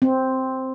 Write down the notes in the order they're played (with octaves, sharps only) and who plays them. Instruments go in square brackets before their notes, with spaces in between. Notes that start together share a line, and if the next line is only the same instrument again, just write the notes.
[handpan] C4